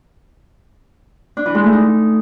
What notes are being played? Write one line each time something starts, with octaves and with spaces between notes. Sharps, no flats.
D4
E3
G#3
A3
D#4